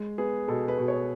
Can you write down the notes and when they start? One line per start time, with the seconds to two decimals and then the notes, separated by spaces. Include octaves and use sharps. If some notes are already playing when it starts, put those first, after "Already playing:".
Already playing: G#3
0.18 B3 G#4
0.48 B2 A4
0.68 B4
0.78 B2
0.88 C#5